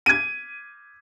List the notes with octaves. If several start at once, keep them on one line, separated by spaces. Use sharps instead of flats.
G#6 D#7